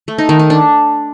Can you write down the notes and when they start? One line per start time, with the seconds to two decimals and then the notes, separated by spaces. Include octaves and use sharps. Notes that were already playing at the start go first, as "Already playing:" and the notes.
0.08 A3
0.18 D#4
0.29 D#3
0.40 D#4
0.50 D4